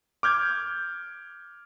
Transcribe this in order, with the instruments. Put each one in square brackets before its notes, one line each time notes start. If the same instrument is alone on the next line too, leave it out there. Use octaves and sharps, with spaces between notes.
[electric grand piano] D6 F6 G6 G#6